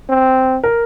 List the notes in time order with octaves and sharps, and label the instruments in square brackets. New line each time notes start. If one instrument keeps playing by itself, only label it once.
[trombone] C4
[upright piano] A#4